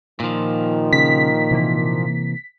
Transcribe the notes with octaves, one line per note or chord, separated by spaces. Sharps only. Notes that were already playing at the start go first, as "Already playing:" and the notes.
A#2 D#3 F3
C#3 B6
C3 E3 A#3